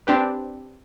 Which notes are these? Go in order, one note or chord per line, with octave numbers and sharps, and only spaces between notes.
C4 D4 G4 B4